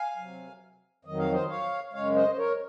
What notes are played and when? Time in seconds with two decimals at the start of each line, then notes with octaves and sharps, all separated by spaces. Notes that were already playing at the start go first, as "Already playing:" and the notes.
Already playing: F5 G#5
0.17 C3 F#3
1.05 F2 D#3 F#3 D#5
1.18 F5
1.32 C5 D#5
1.49 C#5 F5
1.93 F#2 C#3 G#3 C#5 F5
2.15 C5 D#5
2.31 C5
2.37 A#4 C#5